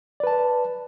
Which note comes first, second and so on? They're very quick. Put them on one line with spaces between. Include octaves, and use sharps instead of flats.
D5 B4 A5